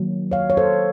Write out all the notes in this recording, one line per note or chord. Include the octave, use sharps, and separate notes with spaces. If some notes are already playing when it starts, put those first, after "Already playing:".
Already playing: D#3 F#3 A#3
C#5 F5
C#5
A4 C5